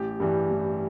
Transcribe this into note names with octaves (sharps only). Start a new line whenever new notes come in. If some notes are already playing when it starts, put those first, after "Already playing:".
Already playing: A1 G4
G2 E3 G3
A1